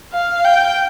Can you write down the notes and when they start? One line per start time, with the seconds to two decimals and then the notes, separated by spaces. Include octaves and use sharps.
0.13 F5
0.44 G5